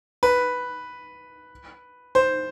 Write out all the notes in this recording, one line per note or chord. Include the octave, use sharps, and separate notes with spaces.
B4
C5